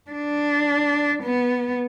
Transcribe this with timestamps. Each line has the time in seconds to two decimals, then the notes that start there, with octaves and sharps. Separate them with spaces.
0.11 D4
1.22 B3